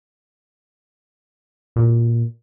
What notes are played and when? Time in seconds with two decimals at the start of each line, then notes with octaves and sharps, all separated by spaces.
1.76 A#2